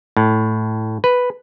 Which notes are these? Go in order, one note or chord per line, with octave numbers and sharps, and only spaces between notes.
A2
B4